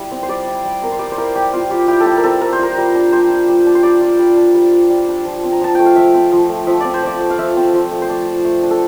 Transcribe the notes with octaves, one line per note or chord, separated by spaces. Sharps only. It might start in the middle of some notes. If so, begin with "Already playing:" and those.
Already playing: G3 E4
C4
C5
G3 D5
E4
G3
C4 A#4
C5
G3 D5
C5
E4 A#4
G3 G4
C4 F4
G3 G4
E4 G4
A4
G3 G4
A#4
C4 A4
G3 A#4
C5
F4 A#4
G3
D4
G3 C5
F4
G3
D4
C5
G3 D5
F4
G3
D4
G3
F4
G3
D4
F3
C4
A#5
F3 A5
A3 G5
F5
F3 E5
C4
F3
A3
F3 E5
C4 D5
C5
F3 D5
A3
F5
F3 E5
C4
F3
A3
C5
A3 D5
F4
A3
D4
A4